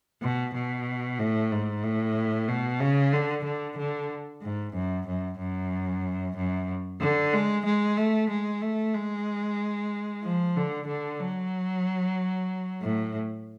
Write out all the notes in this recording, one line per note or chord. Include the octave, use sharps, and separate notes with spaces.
B2
B2
A2
G#2
A2
B2
C#3
D3
D3
D3
G#2
F#2
F#2
F#2
F#2
D3
G#3
G#3
A3
G#3
A3
G#3
F3
D3
D3
F#3
A2